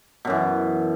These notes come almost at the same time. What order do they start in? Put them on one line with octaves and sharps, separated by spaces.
B2 F#2 E3